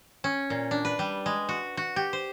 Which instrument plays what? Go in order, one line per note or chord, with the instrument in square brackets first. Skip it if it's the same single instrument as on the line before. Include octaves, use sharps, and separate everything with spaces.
[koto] C#4
A#2
D4
B4
G3
G#3
F#4
F#4
G4
C5